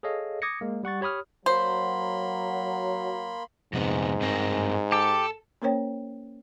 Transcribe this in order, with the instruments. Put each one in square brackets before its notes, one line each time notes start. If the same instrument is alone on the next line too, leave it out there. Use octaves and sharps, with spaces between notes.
[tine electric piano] G#4 A4 C#5 D#5 F5
D6 D#6 G#6 A#6 C#7
G#3 A#3
G3 F#5 C#6 A6
G4 C#5 B5 D#6 F6
[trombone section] F#3 [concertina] A#3 B5 C6 [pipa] C5
[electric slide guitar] F2 C3 B3 [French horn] G#2
[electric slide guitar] G2 C4 A#4
[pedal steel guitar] G4 [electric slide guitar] A4 A5
[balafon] A#3 C#4 A#4 C5 C#5 G5